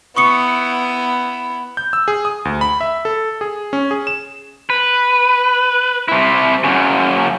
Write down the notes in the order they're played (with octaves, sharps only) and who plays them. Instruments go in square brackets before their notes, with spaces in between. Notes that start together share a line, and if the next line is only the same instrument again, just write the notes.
[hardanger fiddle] B3 E4 [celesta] C#6 D#6 C#7
[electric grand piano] G6
E6
G#4
D#6
D2
B5
E5
A4
G#4
C#4
G#4
E7
[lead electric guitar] B4
C3 E4
F#2 C#3